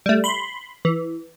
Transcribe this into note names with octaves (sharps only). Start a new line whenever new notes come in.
G3 A3
B5 C6
E3